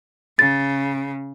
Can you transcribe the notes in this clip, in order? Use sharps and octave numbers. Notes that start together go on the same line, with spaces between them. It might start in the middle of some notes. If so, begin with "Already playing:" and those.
C#3 A6